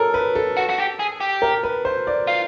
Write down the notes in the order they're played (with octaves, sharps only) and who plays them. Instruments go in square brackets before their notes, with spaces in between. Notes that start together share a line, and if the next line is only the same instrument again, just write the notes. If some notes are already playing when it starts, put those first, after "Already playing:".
Already playing: [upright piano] A4 A#4 C#5
B4
A4
[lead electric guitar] F#4
F#4
G4
G#4
G4
[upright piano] A#4
B4
C5
D5
[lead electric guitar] F4